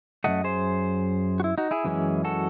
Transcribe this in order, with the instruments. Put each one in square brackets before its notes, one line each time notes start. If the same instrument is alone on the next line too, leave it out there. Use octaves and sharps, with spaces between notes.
[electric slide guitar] F#2 D#3 A3 D#5 F#5
G#4 C5
F#4
E4
D#4 F#4
E4 G#4
F#2 E3 G#3 C#4
F#4 A4